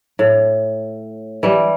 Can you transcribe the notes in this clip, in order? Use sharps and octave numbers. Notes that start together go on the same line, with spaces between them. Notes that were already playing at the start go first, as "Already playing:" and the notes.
A2
E3 G3